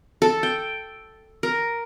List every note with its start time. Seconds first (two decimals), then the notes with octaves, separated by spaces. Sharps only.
0.22 A4
0.43 G5
1.43 A#4